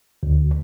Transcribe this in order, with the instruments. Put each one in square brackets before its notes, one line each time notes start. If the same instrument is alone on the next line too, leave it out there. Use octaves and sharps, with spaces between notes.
[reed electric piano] D2